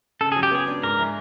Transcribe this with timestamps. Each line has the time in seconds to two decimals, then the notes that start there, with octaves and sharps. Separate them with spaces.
0.21 C#3 A4
0.32 F#3 G#4
0.43 G4
0.51 B3 G#4
0.67 D4
0.83 G#2 A#4
0.99 E3